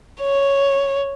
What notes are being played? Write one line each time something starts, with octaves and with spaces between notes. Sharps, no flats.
C#5